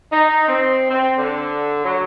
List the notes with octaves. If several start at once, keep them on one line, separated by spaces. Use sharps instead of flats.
D#4
C4
C4
D3
F#3